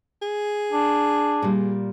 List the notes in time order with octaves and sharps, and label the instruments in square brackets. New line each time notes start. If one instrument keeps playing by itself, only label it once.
[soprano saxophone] G#4
[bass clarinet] D4
[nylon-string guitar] A#2 G3